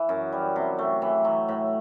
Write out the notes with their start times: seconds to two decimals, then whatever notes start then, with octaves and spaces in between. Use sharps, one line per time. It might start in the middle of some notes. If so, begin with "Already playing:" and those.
Already playing: E3
0.09 F#2
0.32 G3
0.56 C3
0.79 A3
1.02 E3
1.25 F#3
1.48 A2